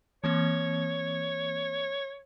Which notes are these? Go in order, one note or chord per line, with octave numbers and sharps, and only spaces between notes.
E3 A#3 C4 C#5